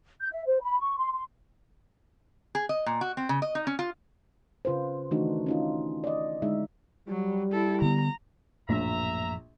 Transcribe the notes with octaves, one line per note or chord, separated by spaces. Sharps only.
G6
E5
C5
B5
C#6
C6
C6
G#4
D#5
A#2
F#4
C4
C#3
D#5
D#4
C#4
F4
C#3 F4 B4 C5
D#3 E3 A3 D4 D#4 F#4
C#4 D#4 F4
D5 D#5
D3 G#3 D#4 E4 E5
F#3 G3
E4 A4
D3 B3 A#5
A#1 F#2 A2 F3 E5 A#5